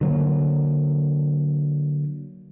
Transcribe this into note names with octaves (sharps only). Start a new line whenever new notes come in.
D3 F#3 A#3